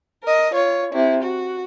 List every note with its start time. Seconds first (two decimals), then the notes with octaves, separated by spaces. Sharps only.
0.24 A#4 D#5
0.54 F4 C#5
0.93 C3 E4
1.23 F#4